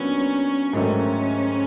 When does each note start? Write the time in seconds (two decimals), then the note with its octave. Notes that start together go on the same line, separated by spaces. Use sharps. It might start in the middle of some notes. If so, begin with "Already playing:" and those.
Already playing: A#2 F#3 B3 C#4 D4 F#4
0.73 G#2 D#3 F#3 A3 C#4